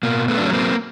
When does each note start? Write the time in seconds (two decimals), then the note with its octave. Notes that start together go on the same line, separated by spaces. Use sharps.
0.03 B2 A#3
0.28 A3 B3
0.38 F#3 D4
0.45 C#4
0.53 A#3 C4